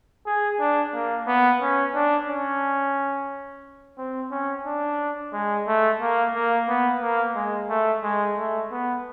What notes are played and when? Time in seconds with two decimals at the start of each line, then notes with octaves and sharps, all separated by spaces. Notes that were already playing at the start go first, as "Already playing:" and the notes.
0.26 G#4
0.60 D4
0.94 A#3
1.27 B3
1.61 C#4
1.95 D4
2.28 C#4
3.98 C4
4.31 C#4
4.66 D4
5.33 G#3
5.67 A3
6.01 A#3
6.34 A#3
6.68 B3
7.02 A#3
7.35 G#3
7.69 A3
8.03 G#3
8.37 A3
8.71 B3